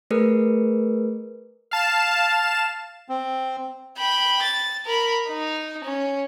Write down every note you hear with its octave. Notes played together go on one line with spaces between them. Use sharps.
A3 G#4 A#4 B4
F5 A5 E7
C4
G5 B5
A6
A#4 B5
D#4
C#4